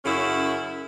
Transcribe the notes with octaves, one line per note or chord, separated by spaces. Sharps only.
F#2 C#3 C#4 E4